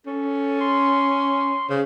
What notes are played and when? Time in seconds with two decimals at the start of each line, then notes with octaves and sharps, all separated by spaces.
0.06 C#4 A4
0.61 C6
1.69 C#3 C5